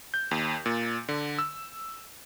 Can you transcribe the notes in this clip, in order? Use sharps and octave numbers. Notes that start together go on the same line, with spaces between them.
G6
D#2
A#2
D3
E6